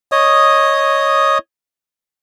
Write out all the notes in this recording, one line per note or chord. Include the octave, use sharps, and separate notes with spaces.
C#5 D#5 D#6